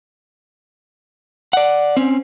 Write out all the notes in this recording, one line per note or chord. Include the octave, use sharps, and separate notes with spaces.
D5 F#5
C4 C#4